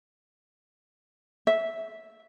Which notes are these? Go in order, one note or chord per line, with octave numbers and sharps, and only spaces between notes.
E5